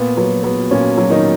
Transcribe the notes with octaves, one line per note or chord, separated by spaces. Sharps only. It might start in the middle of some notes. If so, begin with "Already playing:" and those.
Already playing: A#2 B3
F#3 B3
F#3 B3
A#2 C#4
F#3
D#3 D#4